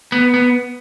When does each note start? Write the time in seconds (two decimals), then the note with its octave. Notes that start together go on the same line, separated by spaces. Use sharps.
0.12 B3
0.34 B3